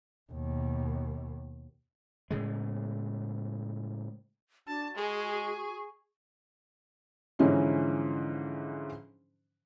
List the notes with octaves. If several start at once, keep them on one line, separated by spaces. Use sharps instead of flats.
D#2 B2
A2 C#3 G#3
D4 F#4 A5
G#3 G#4 C#6
G#2 D3 E3 F3 C#4 D#4